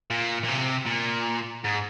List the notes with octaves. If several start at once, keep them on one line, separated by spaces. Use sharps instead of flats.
A#2
A#2
C3
A#2
G#2